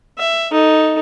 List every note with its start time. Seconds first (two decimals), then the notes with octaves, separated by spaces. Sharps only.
0.18 E5
0.52 D#4 A4